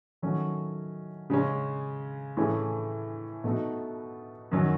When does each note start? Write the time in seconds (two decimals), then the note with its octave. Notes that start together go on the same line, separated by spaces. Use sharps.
0.22 D#3 F#3 A3 C#4
1.30 C#3 G#3 C#4
2.37 A2 E3 A3 C#4 G#4
3.44 B2 A3 D#4 F#4
4.51 F#2 D#3 F#3 C#4